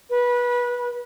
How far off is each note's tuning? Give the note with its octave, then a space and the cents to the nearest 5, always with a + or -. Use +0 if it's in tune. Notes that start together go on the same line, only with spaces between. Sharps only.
B4 -25